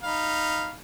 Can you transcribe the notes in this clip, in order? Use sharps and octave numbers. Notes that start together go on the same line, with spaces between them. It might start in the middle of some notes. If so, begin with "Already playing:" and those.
D#4 F5 B5